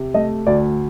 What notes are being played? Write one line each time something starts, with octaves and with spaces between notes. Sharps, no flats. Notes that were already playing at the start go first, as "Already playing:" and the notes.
Already playing: C3
A3 D#5
D2 D5